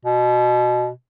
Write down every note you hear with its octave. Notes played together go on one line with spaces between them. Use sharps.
B2